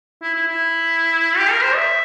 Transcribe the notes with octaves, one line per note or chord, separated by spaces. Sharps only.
E4
E4
E4
G4
A#4
C5
E5